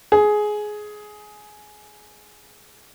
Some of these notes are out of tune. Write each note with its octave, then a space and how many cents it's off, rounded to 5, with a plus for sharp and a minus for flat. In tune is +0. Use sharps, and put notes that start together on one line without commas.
G#4 +15